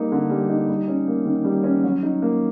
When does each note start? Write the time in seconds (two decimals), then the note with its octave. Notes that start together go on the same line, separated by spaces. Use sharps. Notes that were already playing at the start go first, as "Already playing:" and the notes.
Already playing: G3 A#3 D#4
0.12 D3
0.30 G3
0.49 D#4
0.69 G3
0.88 C#4
1.08 A#3
1.26 D#3
1.45 G3
1.64 C#4
1.84 F#3
2.03 D#4
2.22 A#3